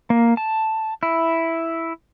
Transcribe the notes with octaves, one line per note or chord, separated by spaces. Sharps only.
A#3
A5
E4